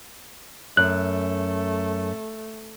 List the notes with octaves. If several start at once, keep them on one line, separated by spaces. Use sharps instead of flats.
F#2 A3 F#6